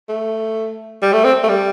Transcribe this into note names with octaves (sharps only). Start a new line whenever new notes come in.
A3
G3
A3
C4
A3
G3